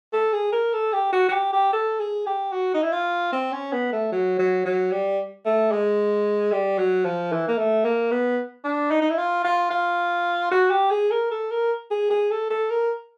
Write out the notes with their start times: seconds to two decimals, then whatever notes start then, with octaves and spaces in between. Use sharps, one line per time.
0.13 A4
0.33 G#4
0.52 A#4
0.73 A4
0.93 G4
1.12 F#4
1.28 F#4
1.32 G4
1.53 G4
1.73 A4
1.99 G#4
2.26 G4
2.52 F#4
2.74 D#4
2.83 E4
2.92 F4
3.32 C4
3.52 C#4
3.72 B3
3.92 A3
4.12 F#3
4.39 F#3
4.65 F#3
4.91 G3
5.45 A3
5.72 G#3
6.52 G3
6.78 F#3
7.04 F3
7.32 E3
7.48 A#3
7.58 A3
7.85 A#3
8.11 B3
8.64 D4
8.91 D#4
9.02 D#4
9.10 E4
9.18 F4
9.44 F4
9.70 F4
10.51 F#4
10.70 G4
10.90 G#4
11.11 A#4
11.31 A4
11.51 A#4
11.91 G#4
12.10 G#4
12.31 A4
12.50 A4
12.70 A#4